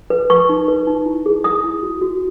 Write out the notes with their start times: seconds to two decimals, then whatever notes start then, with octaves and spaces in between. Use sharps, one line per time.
0.10 B4
0.30 B4 C#6
0.49 D#4
0.68 B4
0.87 D#4
1.06 E4
1.26 G#4
1.44 G#4 D#6
1.64 E4
1.83 F#4
2.02 F#4